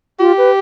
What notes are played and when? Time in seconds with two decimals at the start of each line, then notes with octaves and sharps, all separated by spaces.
0.19 F4 G4
0.38 B4